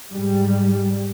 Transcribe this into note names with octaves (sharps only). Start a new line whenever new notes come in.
G#2 G3